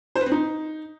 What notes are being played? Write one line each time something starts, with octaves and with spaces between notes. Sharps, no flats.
C5
B4
C4
D#4